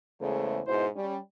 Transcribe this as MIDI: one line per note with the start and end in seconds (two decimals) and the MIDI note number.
0.21 0.60 40
0.21 0.60 49
0.21 0.60 56
0.21 0.60 57
0.21 0.60 72
0.66 0.86 44
0.66 0.86 47
0.66 0.86 64
0.66 0.86 72
0.96 1.16 55
0.96 1.16 61